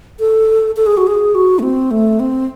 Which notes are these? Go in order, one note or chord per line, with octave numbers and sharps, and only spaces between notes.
A4
A4
G#4
F#4
G#4
F#4
A3
C4
A3
C4